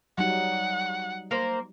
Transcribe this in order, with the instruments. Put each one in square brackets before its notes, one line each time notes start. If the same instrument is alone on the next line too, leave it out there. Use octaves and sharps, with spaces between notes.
[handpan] F#3 G3 D#4 [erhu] F#5
[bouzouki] A#3 A#4 C5